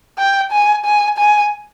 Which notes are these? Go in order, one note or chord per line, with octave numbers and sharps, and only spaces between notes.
G5
G#5
G#5
G#5